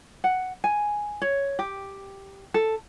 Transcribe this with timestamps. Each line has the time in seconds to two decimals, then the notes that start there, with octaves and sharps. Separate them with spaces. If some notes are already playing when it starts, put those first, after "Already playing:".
0.24 F#5
0.64 G#5
1.22 C#5
1.59 G4
2.54 A4